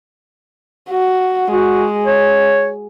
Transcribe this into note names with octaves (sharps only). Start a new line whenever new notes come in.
F#4
G#3 F#4
C#5